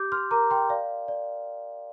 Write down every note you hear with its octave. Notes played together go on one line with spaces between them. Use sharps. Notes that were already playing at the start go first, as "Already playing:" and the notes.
Already playing: G4 D6 G6
C6 F6
A#4 A#5 D6
G5 C6
D5 F5
D5